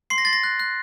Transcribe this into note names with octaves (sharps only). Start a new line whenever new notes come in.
C6 C7
A#6
C6 A6
A#6
F#6
F#6